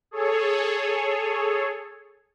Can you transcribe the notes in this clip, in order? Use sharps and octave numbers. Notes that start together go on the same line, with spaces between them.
G#4 A4 C#5